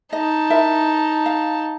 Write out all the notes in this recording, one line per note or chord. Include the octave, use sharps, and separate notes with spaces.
D#4 D#5 A5
E4 A#4 E5
F5